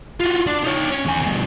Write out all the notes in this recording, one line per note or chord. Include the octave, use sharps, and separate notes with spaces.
F4 F#4
D4
D#4 C#5
C#4
E2 G#5
G2 B2